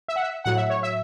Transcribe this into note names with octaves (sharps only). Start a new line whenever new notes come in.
E5
F#5
E5
A2 F#3 F#5
E5
C#5
E5